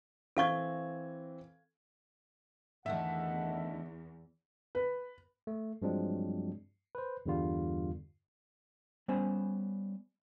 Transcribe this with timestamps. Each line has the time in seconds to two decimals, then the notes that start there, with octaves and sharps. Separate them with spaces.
0.37 E3 C4 A4 F5 C#6 G#6
2.86 E2 D3 D#3 A3 E5 F#5
4.75 B4
5.47 A3
5.82 G2 F3 F#3 G#3 C4 D4
6.95 B4 C5
7.26 E2 G2 D3 G3 F4
9.08 G3 B3 C#4 C5 G#5